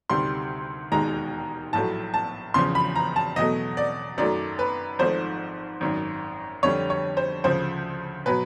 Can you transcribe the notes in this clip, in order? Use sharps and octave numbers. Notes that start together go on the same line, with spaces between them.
D2 C3 D#3 G3 C6
E1 D#2 D#3 G#3 A#5
A#1 A2 F#3 A3 A5
A5
E2 C#3 F3 C6
B5
A#5
A5
E2 B2 F#3 A3 D#5
D5
F#2 D#3 F#3 A3 D5
B4
G#1 G#2 F3 A3 C5
G#1 F#2 D#3
F2 D3 G3 C#5
C#5
C5
D2 C#3 F3 C5
B2 F#3 B4